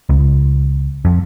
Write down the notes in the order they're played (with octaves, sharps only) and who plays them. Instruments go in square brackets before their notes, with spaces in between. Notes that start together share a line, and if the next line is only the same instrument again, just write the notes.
[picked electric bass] C#2
F2